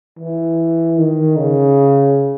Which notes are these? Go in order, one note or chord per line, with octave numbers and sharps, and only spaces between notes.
E3
D#3
C#3